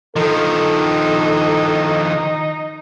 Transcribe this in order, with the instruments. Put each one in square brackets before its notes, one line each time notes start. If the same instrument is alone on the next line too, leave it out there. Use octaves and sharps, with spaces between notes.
[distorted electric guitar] D#3 F3 [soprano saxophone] D#4 [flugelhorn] A4